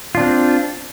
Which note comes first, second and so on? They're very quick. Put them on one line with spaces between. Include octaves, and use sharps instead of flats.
F4 D4 C4